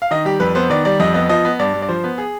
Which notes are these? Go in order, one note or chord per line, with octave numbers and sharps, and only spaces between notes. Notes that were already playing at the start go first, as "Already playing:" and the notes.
F5
D#3 D#5
G3 G4
F2 B4
B3 C5
D#3 D5
G3 D5
F2 D#5
B3 D#5
F3 D#5
B3
G2 D5
G2
D5
F3 C5
B3
G#4